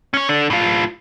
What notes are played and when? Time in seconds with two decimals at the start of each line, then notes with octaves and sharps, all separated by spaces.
0.14 C#4 C#5
0.29 D3 D4
0.50 A2 F4